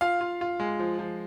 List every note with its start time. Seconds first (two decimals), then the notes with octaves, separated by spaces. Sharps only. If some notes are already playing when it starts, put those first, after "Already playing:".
0.01 F4 F5
0.21 F4
0.41 F4
0.60 G#3
0.79 F3
0.99 F3